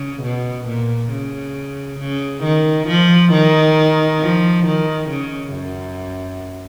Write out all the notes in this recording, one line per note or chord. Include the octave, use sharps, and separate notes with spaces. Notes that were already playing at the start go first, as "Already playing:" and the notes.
Already playing: C#3
B2
A#2
C#3
C#3
D#3
F3
D#3
F3
D#3
C#3
F#2